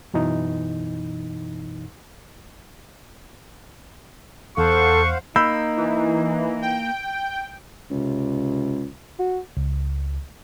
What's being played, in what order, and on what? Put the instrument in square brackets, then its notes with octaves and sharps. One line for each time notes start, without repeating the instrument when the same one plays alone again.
[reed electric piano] F#2 B2 E3 D#4
[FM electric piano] E2 [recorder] A4 [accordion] C5 F5 F#5 [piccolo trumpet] C#6
[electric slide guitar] A#3 [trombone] D#4 [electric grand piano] B5 E6 G6
[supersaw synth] E3
G5
[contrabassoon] C#2 [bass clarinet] C3
[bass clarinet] F#4
[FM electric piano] C#2